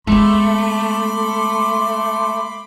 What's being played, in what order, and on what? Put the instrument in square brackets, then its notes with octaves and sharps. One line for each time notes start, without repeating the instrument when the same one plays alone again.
[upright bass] G#3 B3 [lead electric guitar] A3 [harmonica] B5 C6 D6